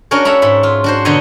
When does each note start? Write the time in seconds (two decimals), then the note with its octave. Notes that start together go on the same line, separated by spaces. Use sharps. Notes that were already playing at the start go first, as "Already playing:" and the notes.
0.11 C#4 D4 F#4 A#4 C#5
0.25 A4 C#5 E5 A#5 B5
0.42 G#2 E5 B5
0.63 F4
0.84 D4 F#4 C5
1.05 B2 D3 D4 D#4 C#5 D#5